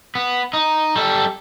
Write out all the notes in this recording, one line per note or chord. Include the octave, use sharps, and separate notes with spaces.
B3
D#4
G3 A4